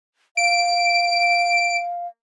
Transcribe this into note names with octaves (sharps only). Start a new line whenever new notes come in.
F5 D7